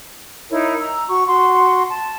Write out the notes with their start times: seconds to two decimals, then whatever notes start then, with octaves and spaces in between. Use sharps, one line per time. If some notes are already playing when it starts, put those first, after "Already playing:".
0.50 D#4 E4 A#4 C#5
0.80 A#5 E6
1.08 F#4 C#6
1.27 F#4 C6
1.89 A5